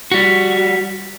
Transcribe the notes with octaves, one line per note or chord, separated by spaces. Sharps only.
G3 F#4